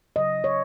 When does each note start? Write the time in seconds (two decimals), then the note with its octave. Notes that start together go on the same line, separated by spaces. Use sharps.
0.16 C#3 F#3 D#5
0.44 C#5